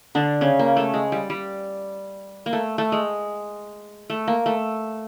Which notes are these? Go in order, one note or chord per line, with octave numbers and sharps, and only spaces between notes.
D3 D4
C#3 C#4
A#3
A3
G#3
G3
G3
A#3
A3
A3
G#3
A3
A#3
A3